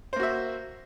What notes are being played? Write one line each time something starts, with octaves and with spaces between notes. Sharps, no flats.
A#3 F#4 C5 E5